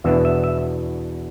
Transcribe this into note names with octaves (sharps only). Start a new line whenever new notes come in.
E2 B2 B3 D4 E5
E5
E5